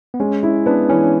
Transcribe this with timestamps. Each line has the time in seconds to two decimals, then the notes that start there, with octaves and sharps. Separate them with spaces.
0.14 B3
0.20 G#3 C#4
0.43 E4
0.66 B3 D4
0.90 E3 C#4